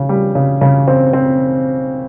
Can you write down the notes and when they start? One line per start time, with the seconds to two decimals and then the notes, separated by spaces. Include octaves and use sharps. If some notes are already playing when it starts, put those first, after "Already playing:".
Already playing: C#3
0.09 G3
0.35 C#3
0.61 C#3
0.88 C4
1.13 C4